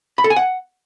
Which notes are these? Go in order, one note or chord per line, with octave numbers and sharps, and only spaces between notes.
B5
A4
G#5
F#5